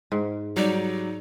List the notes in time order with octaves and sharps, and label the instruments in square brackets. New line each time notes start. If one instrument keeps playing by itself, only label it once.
[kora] G#2
[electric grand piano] F#3 D5 [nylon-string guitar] G3 [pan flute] D#4